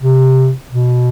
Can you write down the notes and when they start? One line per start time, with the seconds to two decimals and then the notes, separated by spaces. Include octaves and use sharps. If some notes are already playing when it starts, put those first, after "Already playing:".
0.01 C3
0.72 B2